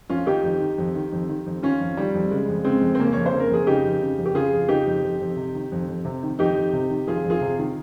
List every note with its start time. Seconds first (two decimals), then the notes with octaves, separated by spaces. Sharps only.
0.09 F2 C#4 F4
0.26 D#3 D#4 G4
0.44 F2
0.60 D#3
0.78 F2
0.95 D#3
1.12 F2
1.29 D#3
1.46 F2
1.63 D#3 C#4 F4
1.80 F2
1.97 D#3 G3
2.14 F2
2.31 C#3 G#3
2.48 F2
2.64 C#3 G#3 C4
2.81 F2
2.95 C4
2.99 C#3 A#3 C#4
3.13 F2 C#5
3.26 C5
3.33 C#3
3.40 A#4
3.51 F2 G#4
3.67 C#3 D#4 G4
3.84 F2
4.02 C#3
4.18 F2
4.26 G4
4.35 C#3 F4 G#4
4.52 F2
4.69 C#3 D#4 G4
4.87 F2
5.03 F2
5.21 F2
5.37 C3
5.55 D#3
5.72 F2
5.88 F2
6.05 C3
6.23 D#3
6.39 F2 D#4 G4
6.56 F2
6.73 C3
6.90 D#3
7.07 F2 F4 G#4
7.24 F2
7.30 F4 G#4
7.41 C3
7.58 D#3